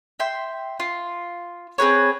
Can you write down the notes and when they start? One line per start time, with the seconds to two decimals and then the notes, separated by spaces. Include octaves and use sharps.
0.20 E5 G5 C6
0.80 F4
1.78 C4 G#4 B4 C#5